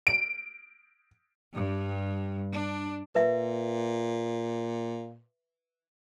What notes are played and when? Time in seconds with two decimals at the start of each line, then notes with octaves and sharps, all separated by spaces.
0.07 D7
1.55 G2
2.52 D4
3.15 A#2 B4 E5